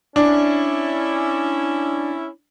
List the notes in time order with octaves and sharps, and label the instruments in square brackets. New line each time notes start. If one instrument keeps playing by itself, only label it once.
[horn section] C#4 E4 [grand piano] D4